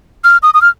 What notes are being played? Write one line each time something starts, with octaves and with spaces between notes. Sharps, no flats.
F6
D#6
D#6
F6